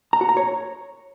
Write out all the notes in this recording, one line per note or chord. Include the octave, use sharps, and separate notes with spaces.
A#5
F#4
A#5
C#5